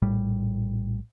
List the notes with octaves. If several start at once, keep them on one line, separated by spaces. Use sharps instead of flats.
A#1 A2 G3